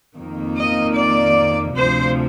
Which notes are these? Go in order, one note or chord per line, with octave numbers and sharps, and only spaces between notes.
F2 D#3 A#3
D#5
D5
D2 C3 F3 C5